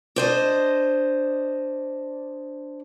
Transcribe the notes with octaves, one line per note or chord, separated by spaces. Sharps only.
D4 C5 D#5